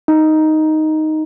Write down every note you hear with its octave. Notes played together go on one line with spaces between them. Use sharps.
D#4